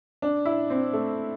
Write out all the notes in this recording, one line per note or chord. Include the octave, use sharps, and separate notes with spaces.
D4
E4
C4
A3